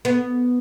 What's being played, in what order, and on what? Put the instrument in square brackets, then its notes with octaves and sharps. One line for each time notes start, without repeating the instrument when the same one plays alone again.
[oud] B3